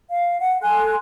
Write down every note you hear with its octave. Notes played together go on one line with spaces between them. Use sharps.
F5
F#5
A4 G#5 C6 F#6